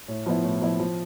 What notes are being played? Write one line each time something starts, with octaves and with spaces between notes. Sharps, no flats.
A2
F3 B3 E4
A2
F3 B3 E4
F3